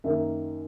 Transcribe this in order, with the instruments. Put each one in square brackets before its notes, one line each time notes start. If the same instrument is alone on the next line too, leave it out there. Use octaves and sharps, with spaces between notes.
[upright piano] F#2 D#3 A#3 E5